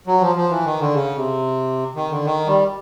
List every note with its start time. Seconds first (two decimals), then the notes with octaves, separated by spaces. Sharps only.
0.07 F#3
0.21 F3
0.36 F3
0.50 E3
0.65 D#3
0.80 D3
0.93 C#3
1.15 C3
1.96 D#3
2.10 D3
2.25 D#3
2.47 G3